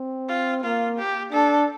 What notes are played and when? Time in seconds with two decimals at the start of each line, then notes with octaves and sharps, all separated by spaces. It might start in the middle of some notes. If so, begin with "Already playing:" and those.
Already playing: C4
0.29 F4
0.63 A#3 F4
0.98 G4
1.33 D4 A4